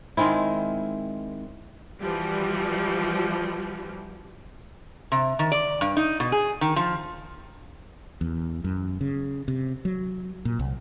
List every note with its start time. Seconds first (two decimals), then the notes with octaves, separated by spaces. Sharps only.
0.17 D#3 G#3 C4 E4
1.99 E3 F3 G3 F#4
5.12 C3
5.39 D#3
5.52 D5
5.81 G2
5.97 D#4
6.20 B2
6.32 G#4
6.61 D#3
6.76 F3
8.21 E2
8.64 F#2
9.01 C#3
9.48 C3
9.85 F#3
10.45 A#2
10.59 C2